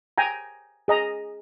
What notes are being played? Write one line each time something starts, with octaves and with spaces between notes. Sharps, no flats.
G5 G#5 A#5
G#4 D#5 A#5